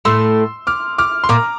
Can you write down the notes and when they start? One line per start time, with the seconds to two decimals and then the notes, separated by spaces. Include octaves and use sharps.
0.05 A2 A3 C6 E6
0.67 D6 F6
0.98 D6 F6
1.24 C6
1.29 A#2 A#3 A#5 D6